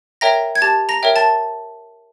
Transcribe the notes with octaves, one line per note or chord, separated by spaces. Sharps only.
A#4 C#5 E5 G5 A#5 A#6
G#6
G4 A5 A6
A#5 A#6
A#4 C#5 E5 G5
A5 A6